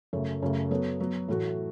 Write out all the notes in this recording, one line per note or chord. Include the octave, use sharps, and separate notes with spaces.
F#2 C#3 A3
F#2 C#3 A3
F#3 B3 A4 C#5
F#3 B3 F#4
A2 E3 A3 F#4